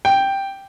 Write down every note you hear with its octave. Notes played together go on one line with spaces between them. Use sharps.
G5